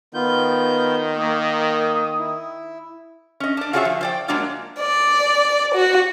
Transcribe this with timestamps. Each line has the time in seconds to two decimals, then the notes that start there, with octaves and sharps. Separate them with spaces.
0.14 D#3 B3 F4 G6
1.17 A#3 D#6
2.19 E4
3.40 C#4 D#5
3.57 D4 D5
3.73 F4 F#4 G#4 C#5 D5 E5
3.85 F3
4.01 C5 D5 G5
4.28 F#3 G#3 A#3 D4 F4
4.80 D5
5.75 F#4